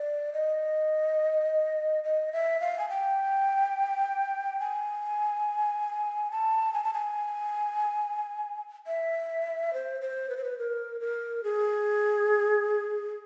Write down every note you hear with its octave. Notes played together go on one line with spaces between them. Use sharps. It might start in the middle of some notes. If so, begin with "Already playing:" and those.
Already playing: D5
D#5
D#5
E5
F5
G#5
G5
G#5
A5
G#5
A5
G#5
E5
C5
C5
B4
C5
B4
A#4
A#4
G#4